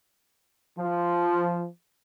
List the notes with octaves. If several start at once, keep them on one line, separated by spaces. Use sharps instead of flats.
F3